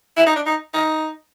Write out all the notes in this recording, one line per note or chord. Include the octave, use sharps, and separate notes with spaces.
E4
D#4
D4
D#4
D#4